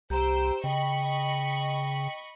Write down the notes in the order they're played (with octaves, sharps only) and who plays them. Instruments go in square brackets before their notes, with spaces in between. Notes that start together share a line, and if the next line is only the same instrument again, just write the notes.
[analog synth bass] C2 [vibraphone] G4 A#5 [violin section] C5 G5 E6
[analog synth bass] C#3 [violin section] D#5 B5 C#6 [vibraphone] G5